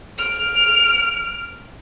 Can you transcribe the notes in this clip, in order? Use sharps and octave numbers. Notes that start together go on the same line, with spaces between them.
F6 D7